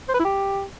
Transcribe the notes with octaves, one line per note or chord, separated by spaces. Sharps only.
C5
B4
E4
G4